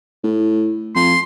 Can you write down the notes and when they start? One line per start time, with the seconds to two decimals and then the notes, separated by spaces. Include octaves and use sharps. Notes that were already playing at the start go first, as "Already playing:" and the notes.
0.24 A2
0.96 F2 C6